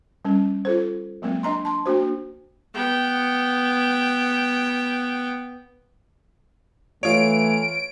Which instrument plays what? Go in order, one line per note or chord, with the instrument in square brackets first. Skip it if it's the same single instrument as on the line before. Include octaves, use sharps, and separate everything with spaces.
[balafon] G3 C#4
F4 A4 C5
F#3 G#3 A#3 C4
D4 D#5 A#5 C6
A5 C6
A#3 D4 F#4 C5
[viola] B3 G5
[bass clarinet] E3 [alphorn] A3 [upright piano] F4 C#5 [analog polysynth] D7